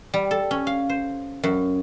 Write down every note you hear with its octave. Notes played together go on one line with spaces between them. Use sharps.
G3
A4
C#4
F5
C5
F#2